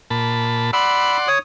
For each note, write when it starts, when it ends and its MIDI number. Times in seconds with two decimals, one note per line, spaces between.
0.10 0.71 46
0.10 0.71 81
0.10 0.71 83
0.73 1.29 74
0.73 1.29 78
0.73 1.17 83
0.73 1.29 84
0.73 1.17 88
1.28 1.39 73
1.28 1.39 87